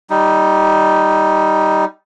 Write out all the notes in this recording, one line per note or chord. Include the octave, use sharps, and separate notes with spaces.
G3 D#4